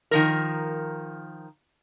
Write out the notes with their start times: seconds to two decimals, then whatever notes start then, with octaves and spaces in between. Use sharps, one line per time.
0.11 D#3 F3 A#4